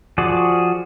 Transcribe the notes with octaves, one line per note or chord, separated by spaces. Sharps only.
F3 F#4 G#4 D5